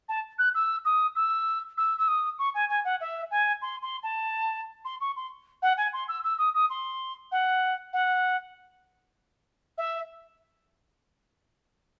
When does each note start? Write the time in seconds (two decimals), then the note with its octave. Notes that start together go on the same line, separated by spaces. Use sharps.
0.09 A5
0.38 F#6
0.55 E6
0.85 D#6
1.16 E6
1.78 E6
1.98 E6
2.08 D#6
2.39 C#6
2.54 G#5
2.69 G#5
2.85 F#5
3.00 E5
3.31 G#5
3.62 C6
3.82 C6
4.03 A5
4.85 C6
5.01 C#6
5.16 C6
5.62 F#5
5.77 G#5
5.93 C6
6.08 E6
6.24 E6
6.39 D#6
6.55 D#6
6.70 C6
7.32 F#5
7.93 F#5
9.78 E5